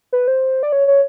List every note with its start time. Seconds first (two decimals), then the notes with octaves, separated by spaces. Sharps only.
0.13 B4
0.28 C5
0.63 D5
0.72 C#5
0.88 C#5